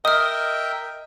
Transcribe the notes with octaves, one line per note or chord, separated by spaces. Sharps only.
A#4 D#5 E5 G5 D#6 F6